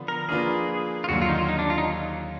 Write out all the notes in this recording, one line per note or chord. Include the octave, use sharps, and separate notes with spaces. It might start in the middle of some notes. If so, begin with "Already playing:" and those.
Already playing: D3 F3 B3 D4
A#4
F3 A#3 D4 F4 G#4 B4
F4
D#2 D3 F#3 F#4
F4
D#4
F4
D#4
D4
F4
D#4